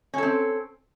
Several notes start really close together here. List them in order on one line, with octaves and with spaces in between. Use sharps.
C#4 A4 C4